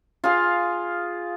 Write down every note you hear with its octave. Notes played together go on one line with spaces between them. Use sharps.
F4 G#4 F5